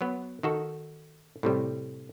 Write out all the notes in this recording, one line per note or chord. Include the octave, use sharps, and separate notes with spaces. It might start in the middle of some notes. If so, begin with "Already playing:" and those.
F#3 B3
D#3 F#4 A4
A2 C3 G3